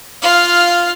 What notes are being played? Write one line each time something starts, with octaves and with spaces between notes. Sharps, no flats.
F4 F5